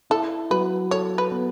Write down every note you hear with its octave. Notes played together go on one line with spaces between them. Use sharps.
E4 A4
F#3 B4
A4 C#5
B4
B3